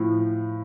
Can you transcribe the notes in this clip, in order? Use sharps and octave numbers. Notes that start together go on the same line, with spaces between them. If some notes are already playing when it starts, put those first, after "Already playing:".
Already playing: A2 F3